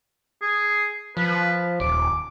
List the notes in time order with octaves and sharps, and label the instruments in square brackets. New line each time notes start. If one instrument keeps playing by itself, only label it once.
[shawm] G#4
[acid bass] F3 [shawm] B4
[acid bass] D#1 [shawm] D6